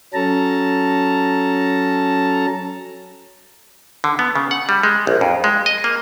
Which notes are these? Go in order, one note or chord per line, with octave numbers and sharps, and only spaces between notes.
F#3 C#4 A4 A5 A#5
D3
B3
C#3
F#5
G3
G#3
A#1
F2
G#3
D#5
A#3